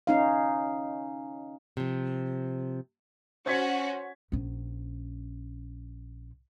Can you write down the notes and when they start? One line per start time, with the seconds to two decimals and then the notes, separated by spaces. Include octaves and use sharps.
0.07 C#4 D#4 F5
1.77 C3 F3
3.46 C#4 F#4 C5 G#6 B6
4.32 A#1 C#4